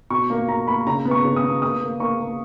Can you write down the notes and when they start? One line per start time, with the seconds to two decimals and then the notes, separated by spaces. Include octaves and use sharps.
0.10 B2 C#6
0.30 A#3
0.48 A#3 A#5
0.67 A#3 B5
0.86 C#3 A#5
1.05 B3
1.11 C#6
1.25 C#3
1.36 D#6
1.44 B3
1.62 A#3 D#6
1.81 A#3
2.00 A#3 C#6
2.19 A#3